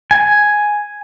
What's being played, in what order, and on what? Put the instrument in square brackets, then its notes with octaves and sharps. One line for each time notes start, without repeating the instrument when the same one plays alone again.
[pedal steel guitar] G#5